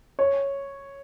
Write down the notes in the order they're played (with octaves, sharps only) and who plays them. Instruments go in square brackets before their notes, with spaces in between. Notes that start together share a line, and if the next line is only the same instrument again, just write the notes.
[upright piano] C#5